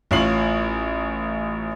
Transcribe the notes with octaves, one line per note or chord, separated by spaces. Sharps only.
A1 F4 C#5 F5 C7 F#7